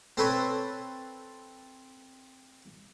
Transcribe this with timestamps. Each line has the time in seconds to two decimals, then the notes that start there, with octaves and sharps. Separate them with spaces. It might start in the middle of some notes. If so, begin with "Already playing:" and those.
0.17 C4 A4 B4 C#5